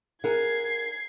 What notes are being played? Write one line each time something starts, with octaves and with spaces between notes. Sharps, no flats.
G#4 A#4 F#5 G#6 C7